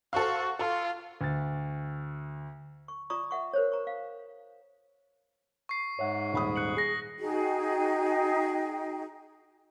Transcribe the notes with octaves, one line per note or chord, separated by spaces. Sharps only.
F#4 A4 C5 F5
F4 A4
D2 A6
C#6
F4 D5 A#5 C#6 D#6
E5 F#5 C#6
A#4 C5 C#5
A#5 C#6
F5
C#6 C7
G#2 C#5 E5 F#5
D#1 B5 D#6
F#6 C#7 F#7
G#4 A#6 C7
D#4 F#4 G#4 G5